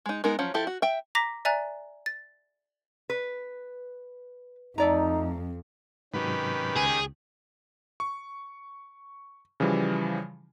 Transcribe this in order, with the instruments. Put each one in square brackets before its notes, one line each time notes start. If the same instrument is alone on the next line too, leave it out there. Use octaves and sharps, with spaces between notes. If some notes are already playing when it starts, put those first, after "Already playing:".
[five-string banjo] G#3 D#4
G#3 B3 D#4 A#4
F3 F#3 C#4
F3 E4 G4 A4
F#4
E5 G5
[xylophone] A#5 D6 A#6 B6
D5 E5 G#5 A#5 F#6 A6
A6
[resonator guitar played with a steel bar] B4
[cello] F2 [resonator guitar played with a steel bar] A3 D5 A#5 [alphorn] D#4
[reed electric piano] G#2 C3 F#3 [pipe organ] D#3 C#4 G4 [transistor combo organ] B4
[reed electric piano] C#2 [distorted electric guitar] G#4
[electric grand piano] C#6
C#3 E3 F3 G3